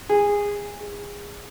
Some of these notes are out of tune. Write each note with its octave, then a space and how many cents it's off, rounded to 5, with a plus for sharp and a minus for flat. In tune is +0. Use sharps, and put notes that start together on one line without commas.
G#4 -20
G#4 -25